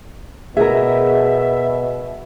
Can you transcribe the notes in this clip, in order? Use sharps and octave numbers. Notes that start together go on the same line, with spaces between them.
B2 G#4 A#4 E5